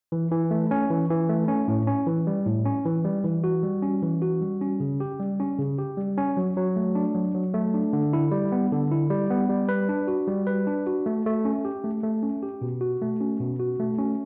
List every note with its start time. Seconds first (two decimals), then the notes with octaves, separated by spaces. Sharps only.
0.12 E3
0.31 E3
0.51 A3
0.71 C#4
0.90 E3
1.10 E3
1.29 A3
1.48 C#4
1.68 A2
1.87 C#4
2.07 E3
2.27 G3
2.46 A2
2.65 C#4
2.85 E3
3.05 G3
3.24 E3
3.44 F#4
3.63 G3
3.82 C#4
4.02 E3
4.22 F#4
4.41 G3
4.61 C#4
4.80 C#3
5.00 G4
5.19 G3
5.40 C#4
5.59 C#3
5.78 G4
5.98 G3
6.18 C#4
6.37 F#3
6.57 F#3
6.76 A3
6.95 D4
7.15 F#3
7.35 F#3
7.54 A3
7.74 D4
7.93 D3
8.13 E4
8.32 G3
8.52 B3
8.72 D3
8.91 E4
9.10 G3
9.30 B3
9.49 G3
9.69 B4
9.89 D4
10.08 F#4
10.27 G3
10.47 B4
10.67 D4
10.87 F#4
11.06 A3
11.26 A3
11.45 C#4
11.65 G4
11.84 A3
12.03 A3
12.23 C#4
12.43 G4
12.61 B2
12.81 F#4
13.02 A3
13.21 C#4
13.40 B2
13.60 F#4
13.80 A3
13.98 C#4